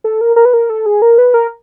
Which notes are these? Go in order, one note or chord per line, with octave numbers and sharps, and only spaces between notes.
A4
A#4
A#4
B4
A#4
A4
G#4
A#4
B4
A#4